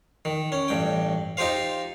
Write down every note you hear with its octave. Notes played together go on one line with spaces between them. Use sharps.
D#3
C#4
A1 G2 G5
D#4 F4 G4 C5 F5